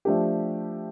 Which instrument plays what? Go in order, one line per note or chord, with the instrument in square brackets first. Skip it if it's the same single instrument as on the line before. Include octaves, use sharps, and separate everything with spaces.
[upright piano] F3 A3 D4 G4